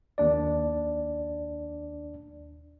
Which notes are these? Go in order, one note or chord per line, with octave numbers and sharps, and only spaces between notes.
D#2 D4 D5